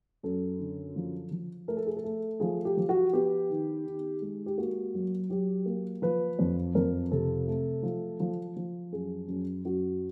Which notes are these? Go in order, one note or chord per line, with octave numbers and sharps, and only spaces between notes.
F#2 A4
D3
F3
F3
A3 A#4
A4
G#4
A4
A3
F3 G#4
G4
F3
F#4
B3 G4
D#3
D#3
G#3
G4
A#3 F#4
F#3
F#3 G4
A#3
F3 B4
F2
F2 A#4
C3 A4
A3
F3
F3
F3
F#2 G#4
F#2
F#2 F#4